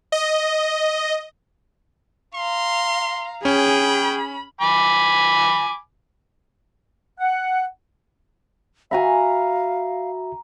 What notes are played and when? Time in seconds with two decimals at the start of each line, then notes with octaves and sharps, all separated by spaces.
0.12 D#5
2.35 F5 A#5 C6
3.45 C#4 G#4 G5 B5
4.61 G#5 B5 D6
7.19 F#5
8.91 F#4 E5 F5 G#5 A#5 B5